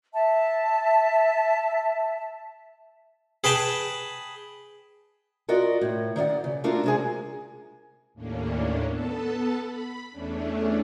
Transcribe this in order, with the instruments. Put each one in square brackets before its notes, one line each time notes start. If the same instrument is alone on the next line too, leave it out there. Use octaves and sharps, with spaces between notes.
[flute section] E5 A5
[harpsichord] G#4 B4 G5 A5
[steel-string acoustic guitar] F4 F#4 A#4 D5 D#5
A2
D#3 D5 D#5 F#5
C#3
A3 D4 F4 F#4 A#4
C3 G#3 G#4
[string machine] D#2 A2 A#3 C#4 D4
B3 A4 A5
B5
E2 A3 C#4 D4